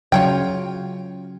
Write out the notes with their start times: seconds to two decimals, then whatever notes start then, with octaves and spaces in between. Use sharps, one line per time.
0.12 C#3 F#3 F4 C#5 G5